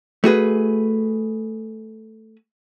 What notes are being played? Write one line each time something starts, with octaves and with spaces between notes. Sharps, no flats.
A3 F#4 G#4 B4